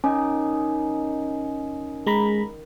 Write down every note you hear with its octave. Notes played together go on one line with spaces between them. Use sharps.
D#3 C#4 D#5 G#5
G#3 A#5 B5